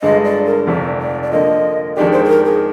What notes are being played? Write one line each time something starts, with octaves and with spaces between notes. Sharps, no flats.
G1 G2 D3 G#3 D#5
D5
A#4
F1 F2 C3 D5
D5
D5
D3 F3 A#3 D#5
F2 D#3 G#3 D4 G4 D5
C5
G#4
A#4
G#4